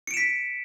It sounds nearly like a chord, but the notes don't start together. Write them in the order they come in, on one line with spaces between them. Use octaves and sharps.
C#7 D7 E7 B6